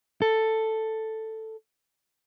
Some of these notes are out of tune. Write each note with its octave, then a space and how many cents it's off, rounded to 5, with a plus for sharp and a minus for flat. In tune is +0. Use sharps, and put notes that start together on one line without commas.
A4 +5